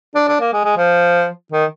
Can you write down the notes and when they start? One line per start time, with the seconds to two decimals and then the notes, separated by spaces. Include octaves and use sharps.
0.15 D4
0.28 D4
0.40 A#3
0.53 G#3
0.64 G#3
0.77 F3
1.52 D#3